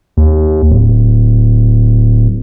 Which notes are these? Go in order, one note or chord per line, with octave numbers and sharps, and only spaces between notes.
D#2
D1